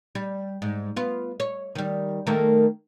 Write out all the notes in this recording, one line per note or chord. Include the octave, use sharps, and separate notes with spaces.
G3
G#2
B3 F4
C#5
D#3 G3
D#3 A3 A#3